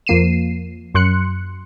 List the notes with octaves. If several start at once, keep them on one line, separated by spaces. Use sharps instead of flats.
F2 F3 A#3 C7 D#7 E7
F#2 C6 F#6 C#7